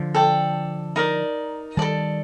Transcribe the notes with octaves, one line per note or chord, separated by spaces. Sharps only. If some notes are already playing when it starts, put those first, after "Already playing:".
Already playing: D3 F3
A4 D5 G5
D#4 A#4 D5
D#3 G3 A4 D5 A5